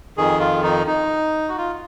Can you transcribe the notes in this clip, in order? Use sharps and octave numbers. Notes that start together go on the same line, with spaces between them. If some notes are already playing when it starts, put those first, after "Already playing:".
F2 D#3 G#4
F4
D#4
D#4
F#4
F4